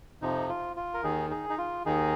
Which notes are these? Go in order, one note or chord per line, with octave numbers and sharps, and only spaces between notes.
F2 C3 F3 D#4
F4
F4
A#4
D#2 D#3 D#4 G#4
D#4 G#4
D#4
F4
D#2 D#3 D#4 G#4